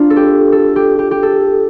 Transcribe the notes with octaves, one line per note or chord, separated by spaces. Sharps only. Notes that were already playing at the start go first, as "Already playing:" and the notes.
Already playing: C4 D4 F4
A4
G4
A4
G4
G4
G4
A4